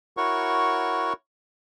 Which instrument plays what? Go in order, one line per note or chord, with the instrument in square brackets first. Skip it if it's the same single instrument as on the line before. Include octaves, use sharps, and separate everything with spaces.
[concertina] E4 F#4 A#4 C#5 F#5 C#6